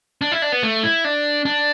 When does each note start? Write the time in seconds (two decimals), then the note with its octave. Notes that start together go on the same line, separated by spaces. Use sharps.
0.21 D4
0.32 E4
0.42 D4
0.52 B3
0.63 A3
0.83 E4
1.05 D4
1.45 D4